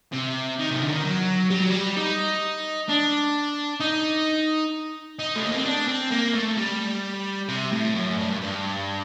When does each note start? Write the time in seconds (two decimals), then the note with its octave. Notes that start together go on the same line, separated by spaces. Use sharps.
0.13 C3
0.59 D#3
0.71 C3
0.82 D3
0.93 D#3
1.05 F#3
1.50 G3
1.60 F#3
1.70 G3
1.97 D#4
2.89 D4
3.80 D#4
5.19 D#4
5.35 A3
5.45 A#3
5.55 C4
5.65 D4
5.88 C4
6.11 A#3
6.34 A3
6.57 G3
7.49 C3
7.72 A2
7.95 F#2
8.18 G2
8.41 G2